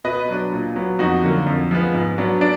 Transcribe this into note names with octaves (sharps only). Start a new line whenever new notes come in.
B2 B4 D#5
F#3 D4
A#2
F#3 B3
F2 D#4 F#4
D3 F#3 A#3
F2
F3 G#3 B3
G#2
F#3 B3 D4
D4